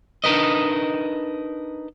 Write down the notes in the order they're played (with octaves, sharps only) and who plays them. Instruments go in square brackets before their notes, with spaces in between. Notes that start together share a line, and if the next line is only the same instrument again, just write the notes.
[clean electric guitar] D4 D#4 A#4 B4 D#5